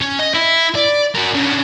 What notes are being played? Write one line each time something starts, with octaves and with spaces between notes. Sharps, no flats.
C#4
D#5
E4
D5
F#4 A#4
D3 C#4